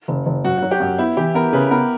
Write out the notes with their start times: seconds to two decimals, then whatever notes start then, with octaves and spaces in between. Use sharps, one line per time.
0.08 F#1
0.26 F#1
0.45 F#2 F#4
0.58 F#3 F#4
0.71 G4
0.80 F#2
0.98 B3 E4
1.17 E3 G4
1.35 B3 A#4
1.53 C#3 B4
1.71 B3 A#4